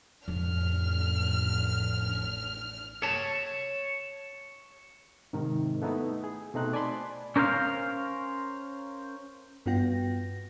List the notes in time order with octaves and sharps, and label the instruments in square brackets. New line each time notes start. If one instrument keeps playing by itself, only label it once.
[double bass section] A1 [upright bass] F2 [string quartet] F6
[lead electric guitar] C#5 A5
[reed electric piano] G#2 C3 D#3
A3 B3 D#4 E4
G#4
B2 A3 C4 D#4 F#6
D5 G#5 A5 B5 C6
[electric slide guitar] C#4 A#4 C5 D#5 F5
[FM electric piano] G2 B3 F4 F#4 G5 A#6